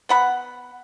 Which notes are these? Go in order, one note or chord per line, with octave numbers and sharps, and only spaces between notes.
B3 F#5 B5